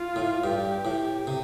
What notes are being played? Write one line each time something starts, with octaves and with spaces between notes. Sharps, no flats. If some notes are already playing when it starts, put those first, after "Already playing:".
Already playing: F4
A2
G2 G4
A2
C3